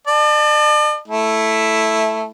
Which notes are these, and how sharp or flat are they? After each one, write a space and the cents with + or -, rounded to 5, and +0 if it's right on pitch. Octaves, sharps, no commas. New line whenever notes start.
D5 +45 A5 +0
A3 +0 E4 +0